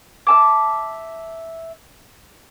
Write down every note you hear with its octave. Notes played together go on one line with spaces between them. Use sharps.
E5 A5 D6